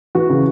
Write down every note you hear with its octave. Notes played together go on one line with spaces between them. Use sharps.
E3 F#4
C#3